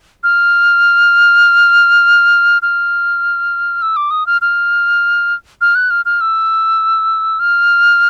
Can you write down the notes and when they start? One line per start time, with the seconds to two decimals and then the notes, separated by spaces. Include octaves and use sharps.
0.24 F6
2.62 F6
3.82 E6
3.96 D6
4.11 D#6
4.27 F6
4.41 F6
5.61 F6
5.75 F#6
5.90 F6
6.05 F6
6.21 E6
7.40 F6